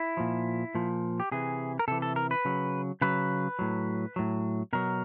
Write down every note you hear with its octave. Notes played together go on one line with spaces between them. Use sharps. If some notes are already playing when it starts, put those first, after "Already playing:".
Already playing: E4
A#2 F3
A#2 F3
G4
C3 E3 G#4
A#4
C3 E3 A4
A4
A#4
B4
C#3 F#3
C#3 F#3 B4
A2 F#3
A2 F#3
B2 F#3 A#4